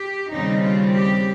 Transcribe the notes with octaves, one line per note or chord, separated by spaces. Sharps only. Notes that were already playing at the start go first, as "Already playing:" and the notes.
Already playing: G4
D#2 C#3 G3 C4 D#4
F4
G4